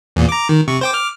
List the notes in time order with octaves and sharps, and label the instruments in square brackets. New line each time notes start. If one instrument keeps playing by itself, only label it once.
[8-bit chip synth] E2 A#2
A#5 D6
D#3
C3 C#6
C5 G5 D6
D6 F6